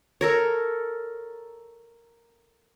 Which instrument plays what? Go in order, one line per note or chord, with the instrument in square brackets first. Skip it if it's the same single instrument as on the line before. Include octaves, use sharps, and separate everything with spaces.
[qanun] A4 A#4 C#5